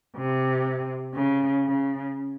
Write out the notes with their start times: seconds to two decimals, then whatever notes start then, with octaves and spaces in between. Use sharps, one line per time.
0.17 C3
1.14 C#3
1.65 C#3